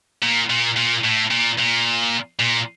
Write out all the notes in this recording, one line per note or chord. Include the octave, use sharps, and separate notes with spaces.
A#2
A#2
A#2
A2
A#2
A#2
A#2